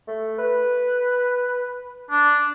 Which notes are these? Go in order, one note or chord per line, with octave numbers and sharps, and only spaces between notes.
A3
B4
D4